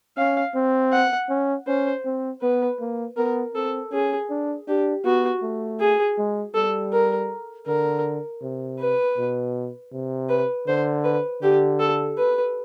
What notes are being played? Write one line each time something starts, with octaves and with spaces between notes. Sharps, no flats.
C#4 F5
C4
F#5
C#4
C#4 C5
C4
B3 B4
A#3
B3 A#4
C4 A4
C#4 G#4
D4
D4 G4
B3 F#4
A3
G#4
G#3
G3 A4
A#4
D3 A#4
C3
B4
B2
C3
B4
D3 C5
B4
D3 G4
A4
B4